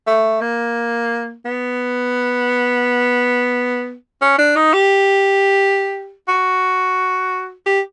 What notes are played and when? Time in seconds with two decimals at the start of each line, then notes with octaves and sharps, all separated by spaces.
0.07 A3
0.41 A#3
1.45 B3
4.22 C#4
4.38 D4
4.56 D#4
4.73 G4
6.28 F#4
7.66 G4